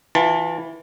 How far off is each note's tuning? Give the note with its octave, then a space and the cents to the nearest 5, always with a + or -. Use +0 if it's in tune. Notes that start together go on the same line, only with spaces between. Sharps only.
E3 +0 F4 +30 A5 +15